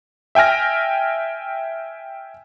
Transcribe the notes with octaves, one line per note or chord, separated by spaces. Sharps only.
E5 G5 G#5 F6 A#6